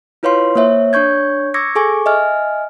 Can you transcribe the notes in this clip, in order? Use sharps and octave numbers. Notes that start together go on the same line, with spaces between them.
E4 F4 B4 C#5 F5 C6
A#3 C5 C#5 E5
D4 C#5 C#6 G6 G#6
C#6 D6 E6 G#6 A#6 C#7
G#4 A4 G#5 C#6 D6
D#5 E5 G#5 F6